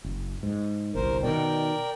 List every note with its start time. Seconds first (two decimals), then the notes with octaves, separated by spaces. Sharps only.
0.04 F#1
0.43 G#2
0.95 G1 C2 A#4 C5
1.23 B2 D#3 A#4 D5 G5